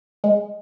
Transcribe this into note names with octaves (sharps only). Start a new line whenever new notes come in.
G#3